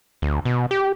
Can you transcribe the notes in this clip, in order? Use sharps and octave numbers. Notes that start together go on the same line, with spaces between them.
D2
B2
G4